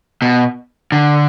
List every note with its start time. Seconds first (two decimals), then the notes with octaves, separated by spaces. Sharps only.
0.22 B2
0.92 D3